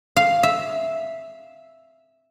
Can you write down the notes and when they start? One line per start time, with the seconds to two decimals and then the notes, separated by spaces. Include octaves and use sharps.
0.16 F5
0.43 E5